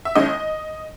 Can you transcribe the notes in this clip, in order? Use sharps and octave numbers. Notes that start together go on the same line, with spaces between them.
E5
D#2 D#3 G#3 C#4 E4 D#5